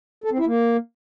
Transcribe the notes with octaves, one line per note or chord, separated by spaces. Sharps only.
A4
C4
E4
A#3